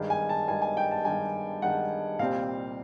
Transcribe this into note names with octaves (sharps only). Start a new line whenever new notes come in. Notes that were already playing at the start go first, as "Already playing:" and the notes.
Already playing: G2 D#3 G#3
G#5
A5
G2 D#3 G#3 G#5
G#5
G5
A5
G2 D#3 G#3 G#5
G2 D#3 G#3 F#5
C2 A#2 G3 C4 F5